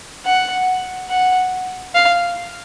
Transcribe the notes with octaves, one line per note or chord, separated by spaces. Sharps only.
F#5
F#5
F5